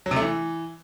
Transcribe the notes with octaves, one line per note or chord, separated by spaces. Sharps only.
F#3
C3
A3
E3